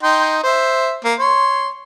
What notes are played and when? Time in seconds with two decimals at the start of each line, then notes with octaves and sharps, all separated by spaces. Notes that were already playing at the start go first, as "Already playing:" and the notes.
0.03 D#4 G5 C6
0.43 C5 E5
1.04 A#3
1.19 C#5 C6